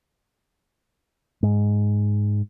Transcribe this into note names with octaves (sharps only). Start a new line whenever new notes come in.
G#2